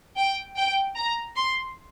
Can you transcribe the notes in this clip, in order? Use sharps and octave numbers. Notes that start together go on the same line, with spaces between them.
G5
G5
A#5
C6